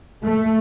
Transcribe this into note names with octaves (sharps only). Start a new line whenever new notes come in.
A3